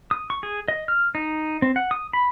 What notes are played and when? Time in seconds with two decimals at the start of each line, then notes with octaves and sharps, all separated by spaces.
0.11 D#6
0.30 C#6
0.43 G#4
0.68 D#5
0.88 F6
1.15 D#4
1.62 C4
1.76 F#5
1.91 D#6
2.13 B5